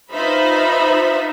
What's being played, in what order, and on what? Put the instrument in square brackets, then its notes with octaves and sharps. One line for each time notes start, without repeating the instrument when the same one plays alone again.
[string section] D#4 F4 B4 C5 E5 B5